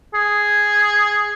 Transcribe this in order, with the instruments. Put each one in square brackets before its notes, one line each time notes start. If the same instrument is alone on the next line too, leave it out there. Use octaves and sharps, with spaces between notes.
[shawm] G#4